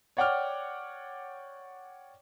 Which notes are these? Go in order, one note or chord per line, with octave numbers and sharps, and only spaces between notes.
C#5 D5 F#5 G5 D6 F6